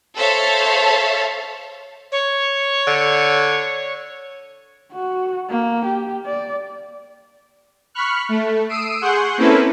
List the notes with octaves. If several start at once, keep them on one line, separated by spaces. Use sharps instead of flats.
A4 C5 C#5 E5 F5 A5
C#5
D3
F#4
A#3
G4
D5
B5 C#6 F6 F#6
A3
D#6 E6 C7 D7 D#7
G#4 F#5 C6 C#6 F#6 G6
A#3 C4 C#4 E4 A4 B4